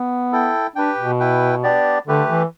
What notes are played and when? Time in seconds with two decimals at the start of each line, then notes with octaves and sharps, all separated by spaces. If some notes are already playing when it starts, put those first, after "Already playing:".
Already playing: B3
0.32 E4 A4 G5
0.76 D4 G4 B4 G5
0.98 B2
1.20 E4 B4 G5
1.63 B3 D4 G4 D5
2.07 D3 A3 G4 B4
2.29 E3